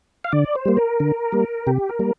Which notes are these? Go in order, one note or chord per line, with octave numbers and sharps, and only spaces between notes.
F5
D3 D5
C5
G3 A#3
A#4
D3
G3 A#3
C3 G4
A#4
G3 A#3